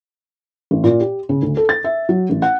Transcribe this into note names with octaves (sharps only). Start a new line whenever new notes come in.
A1
A#2
G4
C#3
D2
A4
A6
E5
F#3
A1
F#5